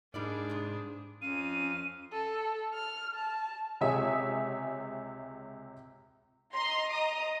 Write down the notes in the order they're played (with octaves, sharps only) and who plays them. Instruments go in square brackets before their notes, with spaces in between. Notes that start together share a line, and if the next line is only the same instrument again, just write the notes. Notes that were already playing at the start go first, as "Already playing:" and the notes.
[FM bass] G#2 [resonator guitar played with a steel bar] G3 A#3 D5 [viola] D4 G#4
[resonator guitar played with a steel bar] G2 C3
[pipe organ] F2 F5 [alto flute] C#4 [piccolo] D#7
[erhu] A4
F6
A5
[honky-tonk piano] C#2 C3 G#4 C#5 E5 D#6
[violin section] D#5 A#5 C6
D#5 A#5 D#6